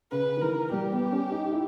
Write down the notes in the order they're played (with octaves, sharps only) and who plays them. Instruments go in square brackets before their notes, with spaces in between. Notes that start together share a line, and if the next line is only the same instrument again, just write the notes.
[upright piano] C#3 [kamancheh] B4
[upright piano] D#3
[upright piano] E3 [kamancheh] A#4
[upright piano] G3 [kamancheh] G4
[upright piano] B3
C#4
D#4
E4